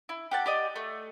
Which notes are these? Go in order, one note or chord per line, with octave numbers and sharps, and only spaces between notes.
E4
G4 F#5 A5
G4 D5 D#5
A3